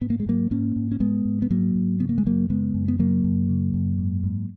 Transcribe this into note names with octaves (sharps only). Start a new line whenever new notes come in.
G#2 B3
A#3
G#3
G#2 F#3 A#3
G#2 A#3 C#4
G#2
C#4
G#2 G#3 B3
G#2
B3
G#2 F#3 A#3
G#2
C#3 B3
A#3
G#3
F#2 F#3 A#3
C#3 G#3 B3
F#2
B3
C#3 F#3 A#3
F#2
C#3
F#2
G#2
G#2